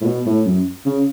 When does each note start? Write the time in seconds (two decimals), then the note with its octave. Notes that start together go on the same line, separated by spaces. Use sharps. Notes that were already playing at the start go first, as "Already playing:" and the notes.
0.01 A2
0.05 B2
0.26 A2
0.46 F#2
0.86 C#3